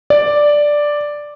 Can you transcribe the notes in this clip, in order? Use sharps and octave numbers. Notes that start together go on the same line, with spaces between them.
D5